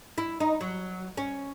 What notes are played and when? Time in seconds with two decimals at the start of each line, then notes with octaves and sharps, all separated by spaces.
0.18 E4
0.40 D#4
0.61 F#3
1.17 C#4